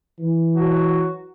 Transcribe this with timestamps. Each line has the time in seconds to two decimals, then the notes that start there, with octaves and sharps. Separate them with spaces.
0.19 E3
0.53 F#3 F#4